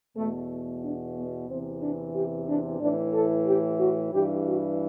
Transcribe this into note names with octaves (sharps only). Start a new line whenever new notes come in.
E2 B2 A3
D4
B3
E2 C3 E3 C4
D4
G4
D4
A2 E3 D4
A4
G4
F#4
G2 E3 G4
F#4